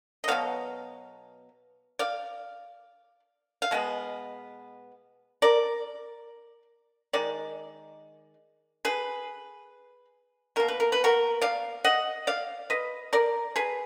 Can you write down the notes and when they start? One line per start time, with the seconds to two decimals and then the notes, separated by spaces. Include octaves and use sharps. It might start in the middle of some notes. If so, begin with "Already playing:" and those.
0.24 D#5
0.28 B2 F#3 B3 F5
1.99 D5 F5
3.62 F5
3.71 B2 G#3 B3
5.42 A#4 D5
7.13 D#3 G#3 D5
8.85 G#4 B4
10.56 B2 A#3 A#4
10.68 B4
10.80 A#4
10.92 B4
11.04 F#4 A#4
11.41 D5 F5
11.84 D#5 F#5
12.27 D5 F5
12.70 B4 D#5
13.13 A#4 D5
13.56 G#4 B4